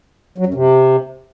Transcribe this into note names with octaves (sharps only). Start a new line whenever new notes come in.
F#3
F#2
C3